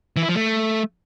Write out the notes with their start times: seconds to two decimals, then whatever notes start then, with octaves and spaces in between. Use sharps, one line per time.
0.16 E3
0.23 E4
0.29 F3
0.35 A3